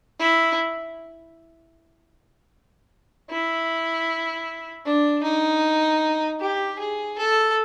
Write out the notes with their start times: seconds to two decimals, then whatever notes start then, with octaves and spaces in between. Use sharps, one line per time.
0.19 E4
3.30 E4
4.85 D4
5.23 D#4
6.40 G4
6.79 G#4
7.18 A4